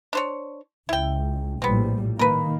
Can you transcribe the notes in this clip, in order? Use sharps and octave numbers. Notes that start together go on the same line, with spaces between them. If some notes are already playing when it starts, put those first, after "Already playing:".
D4 C5 C#5
C#2 E4 G5
A#1 A2 G3 B3 C4
D#3 A#3 A#4 B4